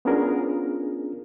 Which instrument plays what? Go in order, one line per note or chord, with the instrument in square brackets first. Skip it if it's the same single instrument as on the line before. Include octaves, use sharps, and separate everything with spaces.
[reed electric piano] B3 C#4 D4 F4 G#4 A#4